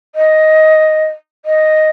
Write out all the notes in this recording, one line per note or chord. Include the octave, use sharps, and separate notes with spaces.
D#5
D#5